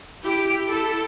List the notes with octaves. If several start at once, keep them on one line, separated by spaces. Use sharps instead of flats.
E4 G4 D7
E4 A4